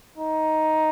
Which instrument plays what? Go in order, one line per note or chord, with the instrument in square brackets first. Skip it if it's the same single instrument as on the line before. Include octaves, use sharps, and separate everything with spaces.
[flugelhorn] D#4